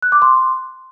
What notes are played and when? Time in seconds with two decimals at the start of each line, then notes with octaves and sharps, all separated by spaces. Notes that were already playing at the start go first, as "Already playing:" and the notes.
0.02 F#6
0.12 D6
0.22 C6